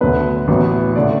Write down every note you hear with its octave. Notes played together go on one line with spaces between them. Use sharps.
D2 D3 F#3 B3 B4
A1 A2 F#3 B3
D3 A3 D5